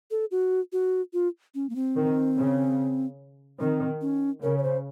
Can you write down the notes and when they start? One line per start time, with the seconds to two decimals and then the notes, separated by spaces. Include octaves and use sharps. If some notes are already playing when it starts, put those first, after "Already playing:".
0.11 A4
0.31 F#4
0.72 F#4
1.13 F4
1.55 C#4
1.69 A#3
1.76 C4
1.96 D#3
2.37 C#3
3.60 D#3 C4
4.01 C#4
4.43 C#3 A#4
4.58 C#5
4.63 C5